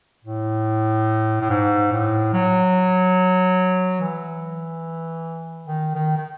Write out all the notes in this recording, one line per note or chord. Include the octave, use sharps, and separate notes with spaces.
A2
A2
G#2
A2
F#3
E3
D#3
D#3
D#3